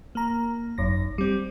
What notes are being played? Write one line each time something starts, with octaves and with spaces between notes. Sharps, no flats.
A#3 A#5
G#1 F#2 A#6
G3 C4